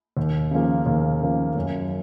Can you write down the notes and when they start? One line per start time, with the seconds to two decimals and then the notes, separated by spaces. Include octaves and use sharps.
0.17 D#2
0.51 C#3 F3 A#3
0.86 D#2
1.22 C#3 F3 A#3
1.55 F#2